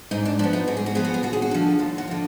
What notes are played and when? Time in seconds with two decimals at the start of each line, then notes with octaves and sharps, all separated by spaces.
0.11 G#2 D#4
0.25 D4
0.39 F3 D4
0.44 B3
0.53 D#4
0.67 G#2 F#4
0.77 G#4
0.86 F#4
0.95 F3 B3 G#4
1.04 F#4
1.14 G#4
1.23 D#2 F#4
1.33 G#4
1.42 F#4
1.51 D3 F3
1.79 D#2 F4
1.98 F#4
2.08 D3 F3